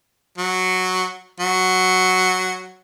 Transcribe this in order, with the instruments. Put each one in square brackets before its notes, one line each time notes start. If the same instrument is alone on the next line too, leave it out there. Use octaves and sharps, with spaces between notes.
[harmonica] F#3
F#3